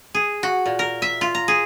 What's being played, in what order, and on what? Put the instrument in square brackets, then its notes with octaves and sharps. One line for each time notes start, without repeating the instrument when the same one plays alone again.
[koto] G#4
F#4
A#2
A#4
E5
F4
A#5
G#4